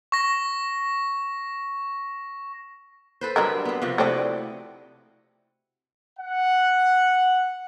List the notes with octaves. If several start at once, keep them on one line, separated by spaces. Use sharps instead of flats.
C#6 A#6
A4 B4 C5
D3 F#3 G3 D4 G4 A#4
B3 C4
C3 F3 F#4
A3 C4 E4 D5 D#5 F#5
F#5